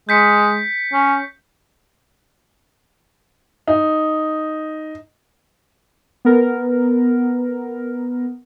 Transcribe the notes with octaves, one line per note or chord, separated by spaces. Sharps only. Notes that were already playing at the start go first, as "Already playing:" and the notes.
G#3 G6 B6 C#7
C#4
D#4
B3 A#4